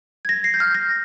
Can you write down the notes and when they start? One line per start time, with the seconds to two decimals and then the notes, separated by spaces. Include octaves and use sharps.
0.25 G#6
0.29 A#6
0.44 C7
0.54 G6
0.60 F6
0.75 A#6